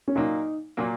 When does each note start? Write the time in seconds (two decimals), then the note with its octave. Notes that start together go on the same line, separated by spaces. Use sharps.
0.08 C#4
0.16 A#2 F#3 A#3 D#4
0.77 A#2 F#3 A#3